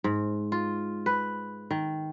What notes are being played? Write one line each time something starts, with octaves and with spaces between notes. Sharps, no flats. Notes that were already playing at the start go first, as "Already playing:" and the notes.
G#2
F4
B4
D#3